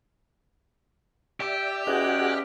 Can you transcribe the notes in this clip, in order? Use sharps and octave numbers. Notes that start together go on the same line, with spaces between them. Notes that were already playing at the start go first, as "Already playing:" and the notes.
G4 D5 E5
E2 C#4 F#4 G#4 D#5 F#5